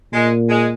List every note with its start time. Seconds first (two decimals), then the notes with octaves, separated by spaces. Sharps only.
0.13 A#2 G#3
0.49 G#3